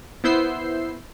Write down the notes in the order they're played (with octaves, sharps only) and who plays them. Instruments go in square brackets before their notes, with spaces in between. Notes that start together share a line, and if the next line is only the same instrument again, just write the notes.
[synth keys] B3 E4 C5 E6 G6 C7